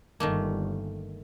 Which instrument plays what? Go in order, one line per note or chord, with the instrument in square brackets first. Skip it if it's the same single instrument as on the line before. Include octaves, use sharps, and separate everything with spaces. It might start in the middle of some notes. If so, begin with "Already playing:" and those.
[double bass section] G1 [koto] D#3 A3 A#3